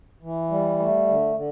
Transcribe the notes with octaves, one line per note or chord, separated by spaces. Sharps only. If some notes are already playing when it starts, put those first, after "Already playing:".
E3
G3
A3
D3
D3